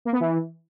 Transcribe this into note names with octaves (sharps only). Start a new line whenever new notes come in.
A#3
B3
E3